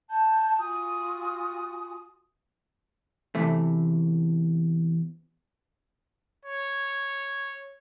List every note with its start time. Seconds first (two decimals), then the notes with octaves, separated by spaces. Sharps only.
0.09 A5 G6
0.58 F4 F#4 G#5 D#6
3.35 E2 C3 E3 A3
6.45 C#5